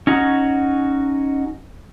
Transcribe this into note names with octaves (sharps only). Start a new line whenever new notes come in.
C#4 D#4 F#4